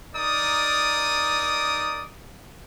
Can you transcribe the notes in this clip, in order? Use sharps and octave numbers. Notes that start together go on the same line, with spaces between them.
D#4 A#4 D5 D#6